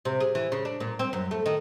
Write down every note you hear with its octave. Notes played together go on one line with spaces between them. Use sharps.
C3
G#4
E3
C#3
D4
A#2
C4
F#2
A3
D#3